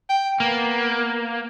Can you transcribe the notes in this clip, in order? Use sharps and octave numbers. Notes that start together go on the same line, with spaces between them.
G5
A#3 B3